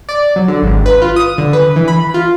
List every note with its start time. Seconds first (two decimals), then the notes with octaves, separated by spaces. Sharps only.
0.09 D5
0.36 F#3
0.48 D3
0.62 G#1
0.86 B4
1.02 F4
1.16 D#6
1.38 D3
1.53 B4
1.76 E3
1.88 B5
2.14 F4